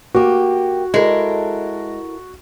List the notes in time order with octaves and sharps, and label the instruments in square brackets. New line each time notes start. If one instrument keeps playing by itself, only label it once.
[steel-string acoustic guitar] A#3 G4 [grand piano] F#4
[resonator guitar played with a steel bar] G#3 [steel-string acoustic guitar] E4 A4 A#4